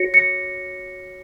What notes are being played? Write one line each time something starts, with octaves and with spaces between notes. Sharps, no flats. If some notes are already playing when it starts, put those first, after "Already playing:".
Already playing: F#4 C#5 A#6 C#7
A#6 C#7